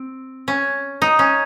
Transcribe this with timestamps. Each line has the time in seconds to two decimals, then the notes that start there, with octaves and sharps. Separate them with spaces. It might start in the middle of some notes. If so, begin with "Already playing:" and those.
Already playing: C4
0.48 C#4
1.02 D#4
1.19 C#4